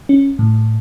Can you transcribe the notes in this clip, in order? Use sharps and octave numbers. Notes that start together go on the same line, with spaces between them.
C#4
A2